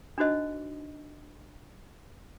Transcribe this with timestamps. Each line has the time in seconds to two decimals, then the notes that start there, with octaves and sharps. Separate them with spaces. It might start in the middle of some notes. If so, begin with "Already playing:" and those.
0.18 D4 D#4 F#4 C5 D#5